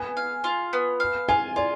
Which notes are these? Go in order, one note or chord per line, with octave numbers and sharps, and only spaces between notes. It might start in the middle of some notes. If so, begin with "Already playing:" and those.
Already playing: B3 G#5
F5
F4
B3
F5
F4 G#5
F4 D5